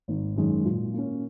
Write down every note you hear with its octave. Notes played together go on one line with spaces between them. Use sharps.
G#1
F#2 D#3 G#3
A#2
A#3 C#4